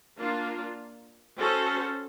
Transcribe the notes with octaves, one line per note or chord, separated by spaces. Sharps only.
A#3 D4 F4
C#4 F#4 A4 C5